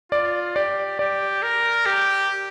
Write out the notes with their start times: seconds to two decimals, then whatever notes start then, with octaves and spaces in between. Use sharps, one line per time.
0.12 F4 D5
0.56 G4 D5
0.99 G4 D5
1.42 A#4
1.86 G4